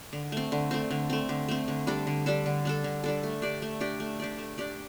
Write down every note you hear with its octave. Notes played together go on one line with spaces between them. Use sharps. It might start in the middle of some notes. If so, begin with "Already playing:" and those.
D3
A3 C4
D3
A3 C4
D3
A3 C4
D3
A3 C4
D3
G3 D4 A4
D3
G3 D4 A4
D3
G3 D4 A4
D3
G3 D4 A4
A3
D4 G4 D5
A3
D4 G4 D5
A3
D4 G4 D5
A3
D4 G4 D5